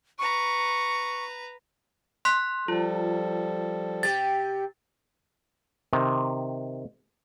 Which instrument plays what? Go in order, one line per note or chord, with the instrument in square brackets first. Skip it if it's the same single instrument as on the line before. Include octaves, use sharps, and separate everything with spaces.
[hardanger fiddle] B4 A#5 [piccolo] C#6
[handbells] C6 F#6 B6
[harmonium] F3 G3 A4 [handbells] F4
[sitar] C3 G4 [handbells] A6
[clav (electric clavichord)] C3 D#3